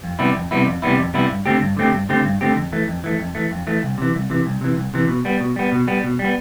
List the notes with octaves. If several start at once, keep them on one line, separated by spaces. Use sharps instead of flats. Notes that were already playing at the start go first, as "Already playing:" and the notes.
F2
C3 G3 B3 E4
F2
C3 G3 B3 E4
F2
C3 G3 B3 E4
F2
C3 G3 B3 E4
G2
D3 A3 C4 G4
G2
D3 A3 C4 G4
G2
D3 A3 C4 G4
G2
D3 A3 C4 G4
F2
E3 A3
F2
E3 A3
F2
E3 A3
F2
E3 A3
C2
C3 E3
C2
C3 E3
C2
C3 E3
C2
C3 E3
B2
G3 B3
B2
G3 B3
B2
G3 B3
B2
G3
B3